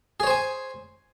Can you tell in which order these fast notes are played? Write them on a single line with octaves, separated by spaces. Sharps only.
G#4 C#5 C5 G#5